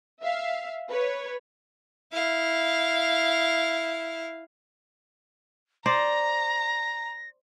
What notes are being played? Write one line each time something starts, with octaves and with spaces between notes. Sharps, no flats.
E5 F5
B4 C#5
E4 F5
C5 D5 A#5 A#6